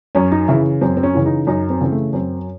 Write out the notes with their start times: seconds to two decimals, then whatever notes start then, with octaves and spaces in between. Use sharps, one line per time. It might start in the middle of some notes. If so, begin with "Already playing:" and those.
0.15 F#2 C#4
0.32 D#4
0.48 C#3 E3 E4
0.81 F#2 C4
0.97 C4
1.03 C#4
1.14 C#3 E3
1.26 D#4
1.47 F#2 D#4
1.70 C4
1.81 C#3 E3 C4
1.91 A3
2.13 F#2 C4